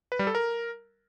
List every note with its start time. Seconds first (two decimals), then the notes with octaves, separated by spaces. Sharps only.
0.12 B4
0.19 G3
0.27 A4
0.35 A#4